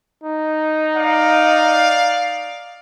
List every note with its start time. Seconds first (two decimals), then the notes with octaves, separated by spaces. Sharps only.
0.24 D#4
0.96 D5 F5